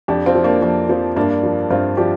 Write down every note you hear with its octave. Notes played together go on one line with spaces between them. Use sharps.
F2 D4 G4
C4 F4
F3
A#3 D4
F2 A#3
F3 C4
G2 A#3 D4
F3
G2 C4 F4
F3 D4 G4